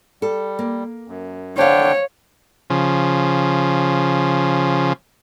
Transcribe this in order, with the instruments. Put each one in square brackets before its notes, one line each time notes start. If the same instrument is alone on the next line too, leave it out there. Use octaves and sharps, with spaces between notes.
[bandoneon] G3 [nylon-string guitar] A4
[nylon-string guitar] A#3
[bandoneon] F#2
[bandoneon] D3 D4 G5 [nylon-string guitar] C5 F5 [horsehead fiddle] C#5
[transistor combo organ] C#3 F3